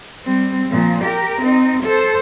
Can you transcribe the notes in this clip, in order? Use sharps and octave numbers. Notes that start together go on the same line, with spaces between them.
G3 C4
A#2 F3
G4 A#4
C4 D#4
A4 C5